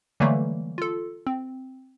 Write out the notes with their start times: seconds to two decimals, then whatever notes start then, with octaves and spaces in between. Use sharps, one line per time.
0.20 D3 E3 F#3 G3 A3 A#3
0.78 F4 A4
1.27 C4